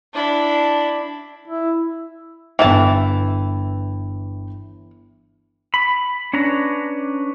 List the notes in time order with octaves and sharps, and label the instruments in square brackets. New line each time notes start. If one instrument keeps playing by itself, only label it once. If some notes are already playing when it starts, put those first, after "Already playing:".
[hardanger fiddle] D4 E4
[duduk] E4
[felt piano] G1 G5 [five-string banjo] E3 E5 A5
[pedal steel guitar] B5
C#4 D4 B4 A#5